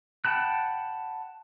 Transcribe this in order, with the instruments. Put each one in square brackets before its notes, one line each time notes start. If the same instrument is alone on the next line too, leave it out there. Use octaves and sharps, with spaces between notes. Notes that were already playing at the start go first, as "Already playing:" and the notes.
[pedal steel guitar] F#5 G5 A5 B5 F#6